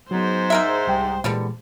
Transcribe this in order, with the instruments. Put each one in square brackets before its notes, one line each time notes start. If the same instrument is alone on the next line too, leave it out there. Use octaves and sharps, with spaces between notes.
[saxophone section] G#2 [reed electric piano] F#3 B3 [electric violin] C5
[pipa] D#4 A#4 E5
[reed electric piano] C2 G3 G5
[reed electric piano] A#2 E3 G#3 [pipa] D3 G3 B3